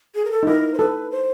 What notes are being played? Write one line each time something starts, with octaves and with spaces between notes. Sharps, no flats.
G#4
A#4
A4
D#4
E4 A#4
C5
A4 B4
C5